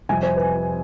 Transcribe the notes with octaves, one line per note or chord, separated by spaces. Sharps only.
F2 C3 G3 G#5
C5
B4